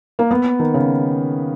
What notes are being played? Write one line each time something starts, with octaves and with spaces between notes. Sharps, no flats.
A#3
B3
D#3
C#3